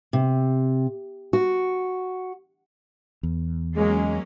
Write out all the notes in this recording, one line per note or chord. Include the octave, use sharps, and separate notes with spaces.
C3
F#4
E2
F#3 G#3 A#3 C#4